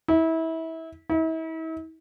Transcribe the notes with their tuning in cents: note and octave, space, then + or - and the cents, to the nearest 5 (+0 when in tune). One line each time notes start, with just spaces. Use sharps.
E4 -25
E4 -40